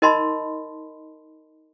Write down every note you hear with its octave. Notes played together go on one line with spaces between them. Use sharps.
D#4 A#4 D#5 A5 B5 C6